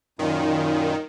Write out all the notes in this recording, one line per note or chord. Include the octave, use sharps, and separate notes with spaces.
F#2 A#2 D#3